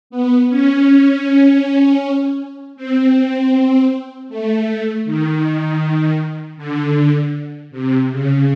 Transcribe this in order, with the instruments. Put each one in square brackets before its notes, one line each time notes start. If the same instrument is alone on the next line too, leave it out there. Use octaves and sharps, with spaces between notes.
[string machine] B3
C#4
C4
A3
D#3
D3
C3
C#3